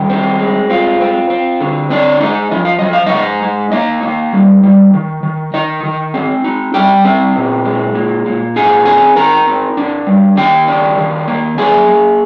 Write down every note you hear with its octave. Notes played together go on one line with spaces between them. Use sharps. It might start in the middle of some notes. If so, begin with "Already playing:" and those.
Already playing: D#3 G3 G4
C4
G#3
C4 F4
C4
C4
D3
C4 D4 D5
G#3 D#4 D#5
F3 D#5
F5
F3 D#5
F5
D#4 D#5
G#3
G#3
A#3 D#4 D#5
A#3
G3
G3
D#3
D#3
D#3 D#4 D#5
D#3
C4
D#4
G3 G4 G5
C4
A#2
G#3
A#2
A#2
D#4 G#4 G#5
C4 G#4 G#5
D#4 A#4 A#5
C4
D4
G3
D#3 G4 G5
D4
D#3
A#3
A#3 G#4 G#5
A#3